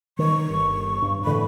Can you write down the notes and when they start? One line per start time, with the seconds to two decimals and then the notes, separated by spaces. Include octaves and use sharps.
0.19 D#3 C#6
0.50 G1
1.02 G2
1.25 A2 D3 E3 B5